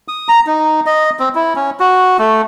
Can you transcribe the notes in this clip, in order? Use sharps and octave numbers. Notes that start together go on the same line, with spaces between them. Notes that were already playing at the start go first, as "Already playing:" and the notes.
D#6
A#5
D#4
D#5
C4
E4
C#4
F#4
A3